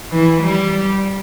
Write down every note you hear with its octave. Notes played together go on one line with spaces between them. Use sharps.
E3
G3